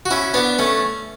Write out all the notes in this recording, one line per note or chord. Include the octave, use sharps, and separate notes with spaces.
F#4
C#4 E4
B3 D4
A3 C#4